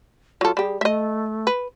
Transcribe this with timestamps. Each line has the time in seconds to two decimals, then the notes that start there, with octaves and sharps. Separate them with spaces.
0.41 F#3 F4 A4
0.57 G3 G4 G#4
0.81 A3 D#5 E5
1.47 B4